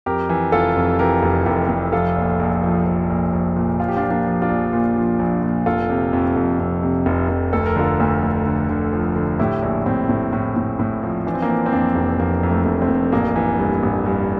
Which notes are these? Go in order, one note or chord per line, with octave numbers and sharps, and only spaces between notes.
F2 G4 A#4
E3
F1 F4 A4
F2
E3 G4 A#4
F1
F1 G4 A#4
F1
F3 F4 A4
A#1
A#1
F3
F3
A#1
A#1
A#2
F3 F4
G4
D4 F4
F3
A#3 D4
F3
D4 F4
A#1
A#2
F3
A#1
A#2
F1 F4 A4
C3
F2
F2
F2
C3
F1
F1
D2 A4
A#4
D3 F4 A4
D2
D2
D3
D3
F3
D3
A2 E4 G4
A#1
A2 C4 E4
A2
A2
A2
A2
F3
E3 D4
C4
A#3 D4
E3
C4
F2 A#3 D4
F1
F1 A#3
F2
A3
F1
A3 C4
F1
A1 A#3 D4
E3
G2
A1
G2